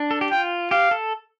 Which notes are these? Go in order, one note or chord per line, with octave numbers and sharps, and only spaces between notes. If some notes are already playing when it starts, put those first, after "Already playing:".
Already playing: D4
A4
G4
F4 G5
G4 F5
A4